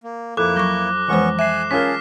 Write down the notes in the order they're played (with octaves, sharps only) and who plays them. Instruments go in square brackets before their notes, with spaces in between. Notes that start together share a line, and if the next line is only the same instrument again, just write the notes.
[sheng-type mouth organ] A#3
[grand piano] F2 [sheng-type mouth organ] A#3 E4 [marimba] A4 [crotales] D6 F#6
[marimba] F#3 C#6 [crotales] D6 A#6 G7
[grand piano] F2 [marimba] E3 G#3 C5 [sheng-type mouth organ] B3 C#4 C#6
[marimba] E5 [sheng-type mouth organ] G#5 F#6 [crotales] C7 E7
[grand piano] C#4 F4 A#4 [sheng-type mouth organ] G#4 A5 [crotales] F6 B6